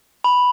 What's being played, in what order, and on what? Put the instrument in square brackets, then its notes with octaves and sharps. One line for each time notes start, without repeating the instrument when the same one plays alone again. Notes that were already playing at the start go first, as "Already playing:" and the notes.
[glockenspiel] B5